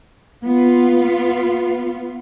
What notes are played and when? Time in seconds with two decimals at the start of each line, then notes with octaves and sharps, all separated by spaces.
0.44 B3 F4